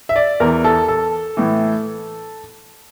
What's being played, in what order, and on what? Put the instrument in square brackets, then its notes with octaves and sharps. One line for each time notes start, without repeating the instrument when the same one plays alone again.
[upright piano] E5
D5
E2 E3 A#4
A4
A4
A2 E3